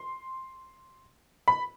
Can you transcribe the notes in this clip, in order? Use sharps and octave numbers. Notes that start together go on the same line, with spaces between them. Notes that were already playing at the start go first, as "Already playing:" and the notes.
Already playing: C6
B5